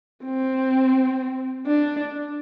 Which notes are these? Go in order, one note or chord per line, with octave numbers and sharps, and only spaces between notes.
C4
D4